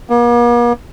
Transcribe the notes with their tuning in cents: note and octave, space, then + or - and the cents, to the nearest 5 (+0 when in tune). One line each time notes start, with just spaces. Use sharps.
A#3 +45